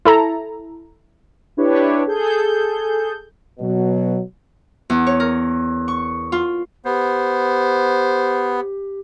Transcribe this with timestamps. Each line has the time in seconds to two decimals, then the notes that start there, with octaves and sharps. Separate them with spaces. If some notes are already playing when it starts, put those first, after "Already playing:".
0.05 E4 A4 A#5
1.57 D4 E4 G4 B4 C#5
2.07 G#4 A4 G6
3.59 B2 F#3
4.90 E2
5.07 C#5
5.20 A#4
5.88 C#6
6.32 F4
6.85 B3 G4 C5